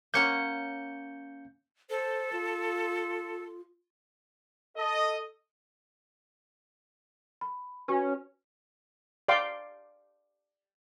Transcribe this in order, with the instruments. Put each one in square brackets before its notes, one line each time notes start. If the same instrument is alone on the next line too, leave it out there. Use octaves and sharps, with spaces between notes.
[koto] A#3 C#4 F#5 [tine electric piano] G6 C#7
[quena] A4 [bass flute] C5
[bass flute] F4
[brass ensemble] A4 D#5
[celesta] B5
[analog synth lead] C#4 [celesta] F#4 B4
[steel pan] D5 F5 G5 C6 D6